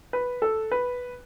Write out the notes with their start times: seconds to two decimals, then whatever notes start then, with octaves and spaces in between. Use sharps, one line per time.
0.13 B4
0.42 A4
0.72 B4